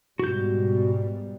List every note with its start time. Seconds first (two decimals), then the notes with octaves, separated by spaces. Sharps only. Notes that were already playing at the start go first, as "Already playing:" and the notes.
0.19 G#2 B2 G3 F#4 G6